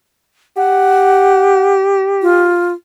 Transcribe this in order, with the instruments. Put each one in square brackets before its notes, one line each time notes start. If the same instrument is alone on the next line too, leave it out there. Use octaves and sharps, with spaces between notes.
[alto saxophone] G4 [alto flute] F#5
[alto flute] F4